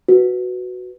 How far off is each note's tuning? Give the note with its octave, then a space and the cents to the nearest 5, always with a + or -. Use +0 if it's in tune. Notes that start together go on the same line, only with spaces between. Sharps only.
F#4 +0 B4 +0